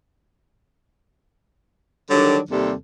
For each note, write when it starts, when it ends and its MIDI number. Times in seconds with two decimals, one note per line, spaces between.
2.10 2.40 50
2.10 2.40 51
2.10 2.40 54
2.10 2.40 55
2.10 2.40 62
2.51 2.73 39
2.51 2.73 48
2.51 2.73 55
2.51 2.73 60
2.51 2.73 69